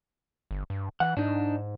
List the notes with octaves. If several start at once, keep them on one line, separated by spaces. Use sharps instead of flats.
G1
G2
E3 F#5
G#2 D4 D#4